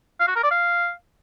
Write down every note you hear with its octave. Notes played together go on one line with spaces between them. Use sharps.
F5
F#4
A#4
D5
F5